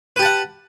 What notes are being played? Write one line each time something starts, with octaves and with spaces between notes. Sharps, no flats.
G4 B4 F#5 A5